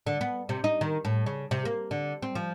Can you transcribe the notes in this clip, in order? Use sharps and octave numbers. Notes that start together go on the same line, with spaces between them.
D3
B3
C3
D#4
D#3
A2
C#3
C3
A#3
D3
C4
F3